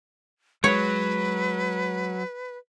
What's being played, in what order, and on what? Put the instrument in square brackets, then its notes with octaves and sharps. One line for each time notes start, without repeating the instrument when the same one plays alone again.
[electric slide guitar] F#3 [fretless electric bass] G#3 [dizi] B4 [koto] C#5